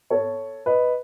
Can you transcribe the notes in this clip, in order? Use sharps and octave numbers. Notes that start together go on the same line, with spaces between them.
A4 C#5
B4 D#5